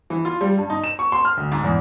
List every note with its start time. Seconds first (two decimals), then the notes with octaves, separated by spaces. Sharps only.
0.10 E3
0.25 F4
0.41 G3
0.58 G2
0.70 D#4
0.84 E7
0.99 C#6
1.12 C6
1.25 F6
1.37 D2
1.52 G#2
1.64 E2